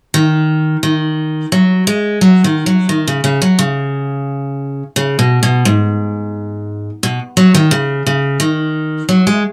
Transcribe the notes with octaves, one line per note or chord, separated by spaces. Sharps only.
D#3
D#3
F#3
G#3
F#3
D#3
F#3
D#3
C#3
C#3
F#3
C#3
C#3
B2
B2
G#2
B2
F#3
D#3
C#3
C#3
D#3
F#3
G#3